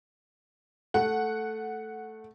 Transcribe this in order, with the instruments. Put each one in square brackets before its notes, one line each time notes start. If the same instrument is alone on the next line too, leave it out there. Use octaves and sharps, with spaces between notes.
[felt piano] A3 [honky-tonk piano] F#5